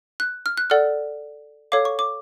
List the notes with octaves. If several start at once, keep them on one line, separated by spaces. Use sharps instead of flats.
F#6
F6
F#6
A4 D5 F#5 F6
A4 C#5 F5 D6
C#6
D6